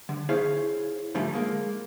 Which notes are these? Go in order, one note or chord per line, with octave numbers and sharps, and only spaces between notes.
D3
E4 G#4 C5 C#5 F5
C#2 G#2 D3 F3 G3 A3
G#3 A#3